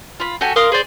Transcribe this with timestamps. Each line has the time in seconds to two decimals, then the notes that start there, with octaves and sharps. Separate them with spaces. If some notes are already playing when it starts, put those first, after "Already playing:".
0.20 F4 B5
0.41 F#4 G4 A4 G#5
0.56 A#4 F5 C6 D#6
0.72 G#4 C5 D5